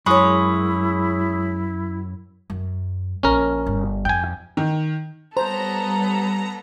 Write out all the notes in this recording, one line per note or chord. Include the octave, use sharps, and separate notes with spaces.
F#2 G#3 E4 C#5 B5 C#6 D#6
F#2
A#1 C#4 A#4
G1
F2 G5 G#5
D#3
G3 B3 A4 C5 C#5 A#5 B5